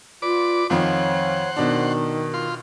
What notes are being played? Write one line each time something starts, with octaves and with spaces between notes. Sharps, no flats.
F4 B4 D5 D6
F2 D#3 F3 C5 C#5 F#5
B2 D#3 D4
F4 C6